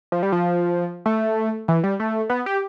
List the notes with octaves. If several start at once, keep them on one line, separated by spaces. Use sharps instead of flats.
F3
G3
F3
A3
E3
G3
A3
B3
G4